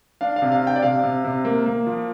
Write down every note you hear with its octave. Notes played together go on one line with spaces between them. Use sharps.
D4 F5
F5
C3
F5
D4
G5
D5
C3 F5
C3
C3
A#3
A#3
F3